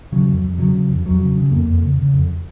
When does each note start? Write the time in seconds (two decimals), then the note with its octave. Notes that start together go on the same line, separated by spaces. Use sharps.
0.12 C#3 F#3
0.28 F2
0.43 F2
0.58 C#3 F#3
0.74 C#3
0.90 F2
1.06 F2 F#3
1.21 C#3
1.37 C#3
1.51 F2 A#3
1.68 F2
1.83 C#3
1.98 C#3
2.13 F2